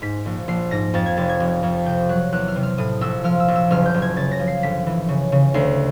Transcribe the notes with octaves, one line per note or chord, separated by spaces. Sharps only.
G#2 B6
A#1
A#1 C7
G#2 A#6
F2 A6
G#6
F1 A6
G#6
F1
F2
C3 G6
F#3 F#6
E2 F#6
F6
C3
F6
A2 D#6
A#1 E6
F3 F6
E6
A#1
E6
F#1 F6
G6
F#1
G#6
C#3 A6
A#6
F3
C7
G1 B6
E3
C#3
C#3
D2 C7